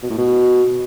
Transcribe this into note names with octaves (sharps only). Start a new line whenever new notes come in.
B2
A2
B2